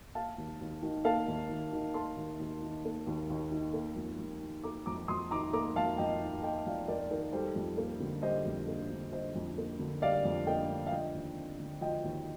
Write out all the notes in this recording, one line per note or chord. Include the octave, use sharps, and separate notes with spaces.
A#3 F5 A5
D#2
D#2
D#3
A#3 F5 A5
D#2
D#2
D#3
A#3 A5 C6
D#2
D#2
D#3
A#3
D#2
D#2
D#3
A#3
F2
F2
D#3
A#3 A#5 D6
F2 A#5 D6
F2 C6 D#6
D#3 A#5 D6
A#3 A#5 D6
F2 F5 A5
F2 D#5 G5
D#3
A#3 D#5 G5
F2 D5 F5
F2 A#4 D5
D#3 A#4
G3 A4 C5
F2
A#3
D3
G3 C5 D#5
F2
A#3
D3
G3 C5 D#5
F2
A#3
D3
G3 D5 F5
F2
A#3 D#5 G5
D3
F5
F3 D#5 G5
D#2
C4
D3
F3 D#5 G5
D#2